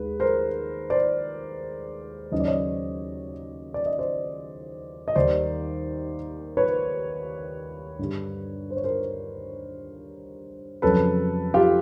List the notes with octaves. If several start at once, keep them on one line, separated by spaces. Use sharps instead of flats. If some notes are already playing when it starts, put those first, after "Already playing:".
Already playing: D#2 D#3 G#3 B4
A#4 C5
C5 D5
D#2 C#3 F#3 D#5
D5
C#5 D#5
D5
D#5
C5 D5
D#5
D#2 D#3 G3 C5 D5
B4 C#5
G2 D3 G3
C5
C#5
A#4 C5
F2 C#3 F#3 A4 B4
F4 G4